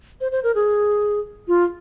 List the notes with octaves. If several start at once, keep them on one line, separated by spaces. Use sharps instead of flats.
C5
C5
A#4
G#4
F4